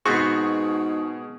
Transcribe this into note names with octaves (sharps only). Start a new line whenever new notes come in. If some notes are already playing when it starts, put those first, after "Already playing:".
G#2 B2 B3 C4 F#4 G#4 C#6